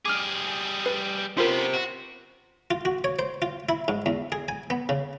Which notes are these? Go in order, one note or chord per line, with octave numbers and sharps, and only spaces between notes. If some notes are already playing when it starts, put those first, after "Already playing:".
G3 G#4 D6 F6
B4
C#3 B3 F4 G4 A#4 C5
F#4
F4
F#4
C#5
C5
F4
E4
G#2
E2
G#4
G#5
B3
C#3